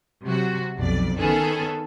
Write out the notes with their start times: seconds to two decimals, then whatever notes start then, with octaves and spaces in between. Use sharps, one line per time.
0.24 C3 F#3 F#4
0.76 B1 F2 D5
1.18 D#3 B3 C#4 G#4 A4